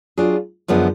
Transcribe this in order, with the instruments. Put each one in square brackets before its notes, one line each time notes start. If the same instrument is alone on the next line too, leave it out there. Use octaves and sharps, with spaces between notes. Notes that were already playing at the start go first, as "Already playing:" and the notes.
[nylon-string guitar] F#3 D4 F4 G#4
F#2 D3 F3 G#3 B3